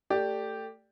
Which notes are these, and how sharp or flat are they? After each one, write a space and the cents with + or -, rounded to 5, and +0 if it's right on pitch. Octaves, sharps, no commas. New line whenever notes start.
A3 +20 G4 +0 D5 +0